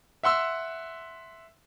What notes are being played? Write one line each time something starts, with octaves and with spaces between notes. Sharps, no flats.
E5 F#5 C6 E6